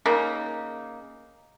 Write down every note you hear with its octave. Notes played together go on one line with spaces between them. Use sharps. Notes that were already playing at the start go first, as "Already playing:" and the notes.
C#3 A#3 D#4